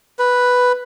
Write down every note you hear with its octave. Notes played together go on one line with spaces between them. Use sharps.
B4